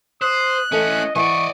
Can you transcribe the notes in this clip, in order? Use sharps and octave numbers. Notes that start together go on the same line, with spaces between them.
C5 D#6 F#6
E3 A3 C#4 A4 D#5
E3 D5 D#5 F#5 C#6